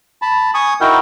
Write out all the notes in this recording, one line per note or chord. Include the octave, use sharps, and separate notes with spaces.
A5 B5
G#5 C#6 D#6
D#4 E4 F#4 A#4 G5